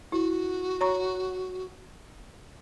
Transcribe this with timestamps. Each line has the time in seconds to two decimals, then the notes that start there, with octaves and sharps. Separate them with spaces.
0.12 E4 F#4
0.81 C#5 A#5 C#6